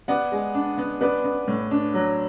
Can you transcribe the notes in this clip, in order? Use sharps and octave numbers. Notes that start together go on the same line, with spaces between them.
B3 D5 F#5
G#3
D4
B3
B3 B4 D5
B3
A2
D4
F#3